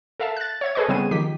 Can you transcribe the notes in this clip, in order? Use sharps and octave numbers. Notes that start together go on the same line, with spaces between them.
A4 A#4 E5 F5 A5
F#6 A6
C#5 E5 G#6
G#4 A4 B4 D#5 C#6
C#3 G3 B3 C4 G#4 D#7
D#3 F3 G4 B6